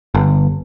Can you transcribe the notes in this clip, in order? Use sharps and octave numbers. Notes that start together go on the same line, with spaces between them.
G1